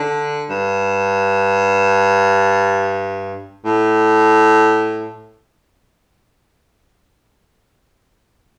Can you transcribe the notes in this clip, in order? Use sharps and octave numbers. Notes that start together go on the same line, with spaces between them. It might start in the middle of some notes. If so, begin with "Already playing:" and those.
Already playing: D3
G2
A2